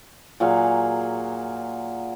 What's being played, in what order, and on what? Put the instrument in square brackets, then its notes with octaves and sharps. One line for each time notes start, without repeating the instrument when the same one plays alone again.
[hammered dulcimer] A#2 F#3 G#4 F5